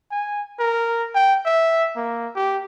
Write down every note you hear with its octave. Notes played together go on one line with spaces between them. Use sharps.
G#5
A#4
G5
E5
A#3
G4